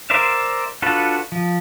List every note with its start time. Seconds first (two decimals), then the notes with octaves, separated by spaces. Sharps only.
0.10 A#4 C5 D5 E5 F5
0.82 D4 F4 F#4 A4 B4
1.32 F3